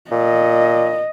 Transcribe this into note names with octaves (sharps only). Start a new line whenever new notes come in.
A#2 D#5